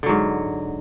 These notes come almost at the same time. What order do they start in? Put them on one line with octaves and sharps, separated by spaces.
D3 F#3 G#2